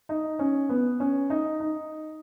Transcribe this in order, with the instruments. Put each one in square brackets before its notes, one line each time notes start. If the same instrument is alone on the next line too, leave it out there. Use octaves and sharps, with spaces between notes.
[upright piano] D#4
C#4
B3
C#4
D#4
D#4